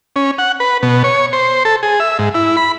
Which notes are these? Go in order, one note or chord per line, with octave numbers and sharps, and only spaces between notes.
C#4
F#5
B4
B2
C#5
C5
A4
G#4
E5
G#2
E4
B5